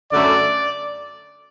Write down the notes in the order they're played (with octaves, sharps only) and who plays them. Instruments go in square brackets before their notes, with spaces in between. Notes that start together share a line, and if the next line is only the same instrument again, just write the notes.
[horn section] F#2 D3 A3 C#4 D5